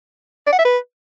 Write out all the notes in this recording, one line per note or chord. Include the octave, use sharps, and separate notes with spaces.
D5
F#5
E5
B4